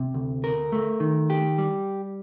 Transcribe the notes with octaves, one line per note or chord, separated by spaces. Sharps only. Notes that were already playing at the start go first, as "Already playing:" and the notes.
Already playing: C3
D2
A#4
A3
D#3
G4
G3